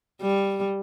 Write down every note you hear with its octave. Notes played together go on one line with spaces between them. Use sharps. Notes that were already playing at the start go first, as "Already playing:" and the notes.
G3